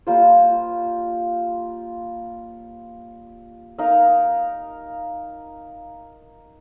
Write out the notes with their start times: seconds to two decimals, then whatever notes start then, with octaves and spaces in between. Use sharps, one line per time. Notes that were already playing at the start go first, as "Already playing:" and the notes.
0.07 G3 A#3 F4 C5
3.78 D#4 A#4 F5